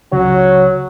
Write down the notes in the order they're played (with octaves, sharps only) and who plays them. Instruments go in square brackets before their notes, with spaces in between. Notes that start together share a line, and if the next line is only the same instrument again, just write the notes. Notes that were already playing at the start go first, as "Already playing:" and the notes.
[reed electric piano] C#2 C#3 C#5 [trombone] F#3